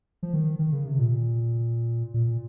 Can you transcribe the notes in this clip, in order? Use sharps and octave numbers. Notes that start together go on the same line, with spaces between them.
F3
D#3
D#3
C#3
C3
A#2
A#2